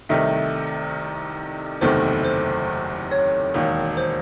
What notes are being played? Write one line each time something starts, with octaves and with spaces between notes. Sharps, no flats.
C2 C3 D#3 A3 D#4 E5
F#1 E2 C3 D#3 A3 C5
C5
C#5
E1 D#2 D#3
C5